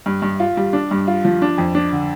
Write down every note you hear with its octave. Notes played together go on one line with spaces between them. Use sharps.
G2
G2
F4
G3
D4
G2
F4
F3
D4
F2
D4
D3